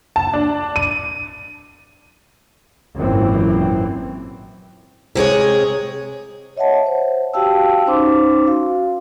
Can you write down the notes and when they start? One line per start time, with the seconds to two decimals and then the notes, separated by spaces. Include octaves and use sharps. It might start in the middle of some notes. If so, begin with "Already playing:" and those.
0.16 A5
0.34 D4
0.76 D#7
2.96 G#1 F#2 A#2 E3 C4
5.15 C3 G#3 G#4 C#5
6.57 C#5 D#5 E5 F#5 A5
6.86 C5
7.34 F#4 G4 F5 G5 A5 E6
7.86 C#4 D#4 C5 C6 D6
8.47 F#4 F5